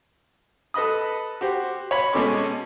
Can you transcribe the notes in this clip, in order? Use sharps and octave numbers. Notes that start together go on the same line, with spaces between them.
A4 B4 D#5 B5 D#6
F#4 G4 C5
C#5 B5
B2 G#3 C#4 A4 C#6 D6